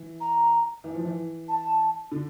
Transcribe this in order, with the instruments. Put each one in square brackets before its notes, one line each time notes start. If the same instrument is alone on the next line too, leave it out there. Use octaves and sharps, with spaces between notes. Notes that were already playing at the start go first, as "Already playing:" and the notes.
Already playing: [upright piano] E3
[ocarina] A#5
[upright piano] E3
F3
E3
[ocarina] A5
[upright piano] D3